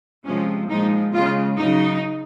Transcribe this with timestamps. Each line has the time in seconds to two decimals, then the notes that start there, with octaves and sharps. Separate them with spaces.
0.25 C3 F3 G#3 C#4
0.69 A#2 F3 G#3 D#4
1.14 C#3 G#3 F4
1.58 C#3 F#3 D#4